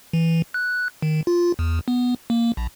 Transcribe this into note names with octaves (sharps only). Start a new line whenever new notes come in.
E3
F#6
D#3
F4
E2
B3
A#3
A#1